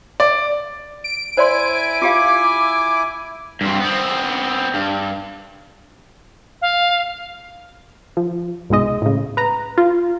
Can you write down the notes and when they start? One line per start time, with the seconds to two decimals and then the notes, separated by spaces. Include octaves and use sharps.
0.20 D5
1.04 D7
1.37 E4 C5 D5 G#5 C6
2.02 F4 G4 F5 D6
3.61 G2 C4
3.80 B3 C4
4.74 G2
6.62 F5
8.17 F3
8.70 C2 G#2 B2 G#3 D#5
9.02 A2 C#3
9.37 B4 A#5
9.78 F4